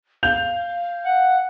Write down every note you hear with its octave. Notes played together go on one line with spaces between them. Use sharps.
F5 G6 F7
F#5